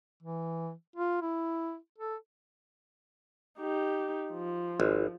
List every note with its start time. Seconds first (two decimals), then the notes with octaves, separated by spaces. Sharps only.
0.22 E3
0.96 F4
1.22 E4
1.98 A4
3.59 D#4 G4
4.32 F3
4.80 G#1